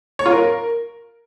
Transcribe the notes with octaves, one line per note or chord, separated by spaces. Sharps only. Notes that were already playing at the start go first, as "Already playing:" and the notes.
C#5
F4
A#4